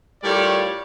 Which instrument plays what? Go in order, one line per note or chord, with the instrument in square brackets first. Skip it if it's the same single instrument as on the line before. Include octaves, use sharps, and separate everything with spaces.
[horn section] A2 G3 F4 A#4 C#5 D5